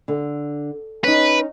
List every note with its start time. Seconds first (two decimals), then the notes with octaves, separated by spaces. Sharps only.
0.08 D3
1.04 C#4 D#4 B4